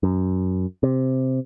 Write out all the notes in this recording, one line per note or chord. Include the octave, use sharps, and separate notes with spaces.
F#2
C3